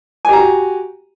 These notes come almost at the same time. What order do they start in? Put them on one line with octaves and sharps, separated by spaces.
G#5 G4 A#5 F#4